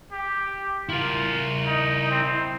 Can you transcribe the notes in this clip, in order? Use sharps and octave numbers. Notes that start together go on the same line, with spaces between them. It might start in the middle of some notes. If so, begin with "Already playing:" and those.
G4
E4 F4 A#4
D#4
C4